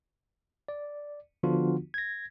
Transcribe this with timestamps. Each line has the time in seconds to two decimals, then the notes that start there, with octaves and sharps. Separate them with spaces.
0.68 D5
1.43 D3 F3 B3 D4 F4 F#4
1.94 G#6 A#6